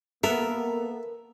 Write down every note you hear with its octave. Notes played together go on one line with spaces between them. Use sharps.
A#3 B3 A4 A#4 E5